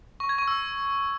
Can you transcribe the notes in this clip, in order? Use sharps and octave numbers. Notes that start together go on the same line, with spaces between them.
C#6
G#6
C#6
E6